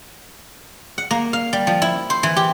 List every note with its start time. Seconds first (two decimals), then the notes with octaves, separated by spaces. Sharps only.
0.98 F#5
1.11 A#3
1.33 F5
1.53 G3
1.67 F3
1.82 E4
2.10 C5
2.23 E3
2.37 G4